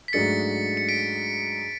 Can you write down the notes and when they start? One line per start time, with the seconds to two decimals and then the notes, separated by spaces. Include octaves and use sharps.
0.08 B6
0.13 G#2 F#3 A3 D4 G#4 A6 C#7
0.77 C#7
0.89 B6 D7